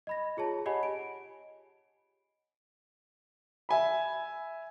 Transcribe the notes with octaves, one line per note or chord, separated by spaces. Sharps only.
D#5 B5 A#6
F4 G#4 C#5 A5
G4 C#5 D#5 F#5 G#5 B5
D7
E5 G#5 B5